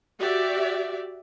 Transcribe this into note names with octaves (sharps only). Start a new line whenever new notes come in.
F#4 G4 D5 E5